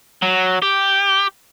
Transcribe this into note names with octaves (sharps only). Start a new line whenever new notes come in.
F#3
G4